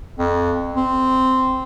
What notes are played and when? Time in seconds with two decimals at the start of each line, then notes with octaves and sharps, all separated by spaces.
0.19 F2
0.76 C4